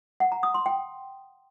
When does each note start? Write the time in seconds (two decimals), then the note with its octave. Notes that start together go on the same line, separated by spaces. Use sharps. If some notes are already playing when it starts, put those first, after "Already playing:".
0.20 F#5
0.32 A#5
0.43 D#6
0.54 C6
0.66 G5